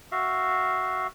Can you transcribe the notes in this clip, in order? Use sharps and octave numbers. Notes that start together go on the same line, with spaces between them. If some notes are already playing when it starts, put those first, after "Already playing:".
F#4 E5 F5